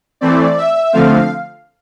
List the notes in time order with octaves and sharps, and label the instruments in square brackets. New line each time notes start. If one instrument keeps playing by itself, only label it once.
[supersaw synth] E3 A3 C4 D5
E5
D3 F3 A3 C4 F5